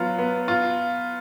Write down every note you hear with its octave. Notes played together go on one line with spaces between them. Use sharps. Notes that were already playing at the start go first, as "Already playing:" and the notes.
Already playing: F#3 B3 F4
B3
F4